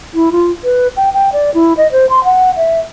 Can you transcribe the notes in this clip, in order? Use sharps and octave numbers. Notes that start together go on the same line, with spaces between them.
E4
F4
B4
G5
G5
D5
E4
D#5
C5
C6
F#5
E5